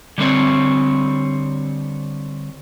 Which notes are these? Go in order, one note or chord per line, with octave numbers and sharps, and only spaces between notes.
D3 G3 C4 C#5